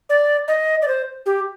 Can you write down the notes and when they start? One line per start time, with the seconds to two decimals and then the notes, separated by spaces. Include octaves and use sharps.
0.10 D5
0.48 D#5
0.82 D5
0.88 C5
1.26 G4